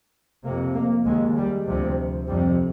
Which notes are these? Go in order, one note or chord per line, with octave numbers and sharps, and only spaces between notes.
F2 C3 A#3
A#3
D#2 G#3
G3
D2 C3 F3
F2 C3 G3